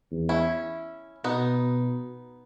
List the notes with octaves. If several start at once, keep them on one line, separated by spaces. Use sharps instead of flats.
E2
C#4 E4
B2 B3 D#4